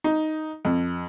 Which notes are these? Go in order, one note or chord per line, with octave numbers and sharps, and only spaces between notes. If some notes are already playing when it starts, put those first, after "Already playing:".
D#4
F2